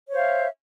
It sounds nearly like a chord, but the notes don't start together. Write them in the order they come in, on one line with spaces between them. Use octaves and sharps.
C#5 C5 F5 E5